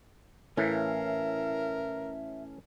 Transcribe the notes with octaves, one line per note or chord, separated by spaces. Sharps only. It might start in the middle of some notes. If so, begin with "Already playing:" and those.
A2 E3 C#4 A4 A#4 E5 F5